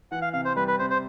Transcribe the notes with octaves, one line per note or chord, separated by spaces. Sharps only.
E3 F#5
F5
C3 F5
C5
G3 B4
B4
C3 C5
C5